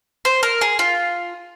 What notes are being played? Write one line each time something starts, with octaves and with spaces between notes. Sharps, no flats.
C5
A#4
G#4
F4